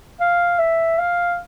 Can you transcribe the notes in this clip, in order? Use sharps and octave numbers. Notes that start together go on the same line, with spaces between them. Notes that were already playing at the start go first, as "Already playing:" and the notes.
F5
E5
F5